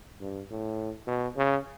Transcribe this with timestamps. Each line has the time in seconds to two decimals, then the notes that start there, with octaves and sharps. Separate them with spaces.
0.21 G2
0.50 A2
1.08 B2
1.37 C#3